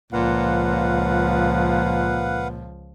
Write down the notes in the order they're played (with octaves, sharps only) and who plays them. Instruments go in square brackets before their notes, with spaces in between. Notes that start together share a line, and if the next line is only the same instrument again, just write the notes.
[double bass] C#2 F3 [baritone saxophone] A#2 [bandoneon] B4 F5 F#5